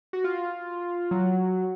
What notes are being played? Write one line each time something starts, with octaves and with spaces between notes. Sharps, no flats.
F#4
F4
F#3